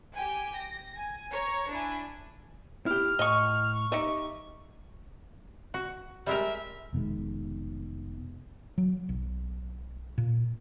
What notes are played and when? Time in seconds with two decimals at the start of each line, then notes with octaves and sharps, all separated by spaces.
0.14 G4 G5 G#5
0.56 A#6
0.95 G#5
1.31 C#5 A#5
1.71 D4 E4 G#5
2.86 E4 G4 F6
3.19 A2 D#5 C#6
3.73 C#6
3.92 D#4 G4 D#5 E5
5.74 F#4
6.27 G3 G#3 A#4 E5
6.93 F1 B2 D#3 G#3
8.78 F#3
9.09 B1
10.18 A#2